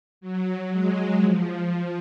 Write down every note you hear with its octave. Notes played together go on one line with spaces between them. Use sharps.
F#3
G#3
F3